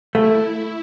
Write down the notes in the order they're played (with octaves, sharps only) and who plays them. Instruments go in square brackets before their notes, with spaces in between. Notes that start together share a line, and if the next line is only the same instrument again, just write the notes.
[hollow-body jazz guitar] A3 [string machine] E4